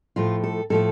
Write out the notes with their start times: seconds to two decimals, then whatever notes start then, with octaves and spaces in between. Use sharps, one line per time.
0.16 A2 F3 A3 F4
0.44 A4
0.70 A2 F3 A3 A4